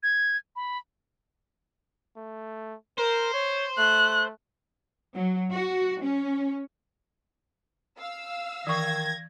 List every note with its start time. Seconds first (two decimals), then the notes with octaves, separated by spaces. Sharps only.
0.03 G#6
0.56 B5
2.16 A3
2.98 A#4 C5
3.34 C#5
3.78 A3 F#6
5.14 F#3
5.51 F#4
6.02 C#4
8.00 F5 E6
8.67 D#3 E3 C#6 G#6 A#6